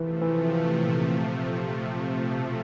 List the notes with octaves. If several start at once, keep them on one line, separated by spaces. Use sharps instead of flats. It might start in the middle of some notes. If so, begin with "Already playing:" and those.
Already playing: C3 E3 F3 A3
E3
A#2
B2